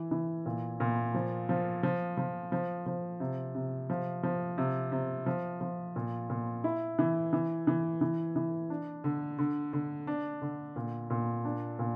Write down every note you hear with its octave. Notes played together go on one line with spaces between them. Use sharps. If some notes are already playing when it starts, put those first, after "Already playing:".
Already playing: E3
E3
A#2
A#2
F3
F3
F3
F3
F3
F3
C3
C3
F3
F3
C3
C3
F3
F3
A#2
A#2
E4
E3
E3
E3
E3
E3
D4
D3
D3
D3
D4
D3
A#2
A#2
D4
A#2